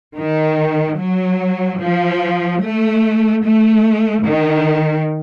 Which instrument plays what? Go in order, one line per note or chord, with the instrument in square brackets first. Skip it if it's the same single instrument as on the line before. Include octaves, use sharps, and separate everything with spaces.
[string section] D#3
F#3
F3
A3
A3
D#3